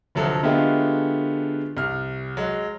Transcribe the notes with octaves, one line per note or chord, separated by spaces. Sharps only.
F1 D2 F3 F#3 A4
D3 G#3 A3 B3 F4 G4
C2 F6
F#3 G#3